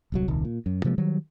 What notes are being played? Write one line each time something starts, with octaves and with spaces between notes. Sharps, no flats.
D1 C2 F#3
D#1 C2 D#3
A#2
F#2
C3 F3 G#3 A#3
D#3 F#3 G3